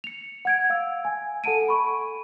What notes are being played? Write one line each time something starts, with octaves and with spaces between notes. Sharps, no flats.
C#7 F7
F#5 G#6 D7
F5 E6
G#5
A4 F#5 A5 D7 D#7
B5 C#6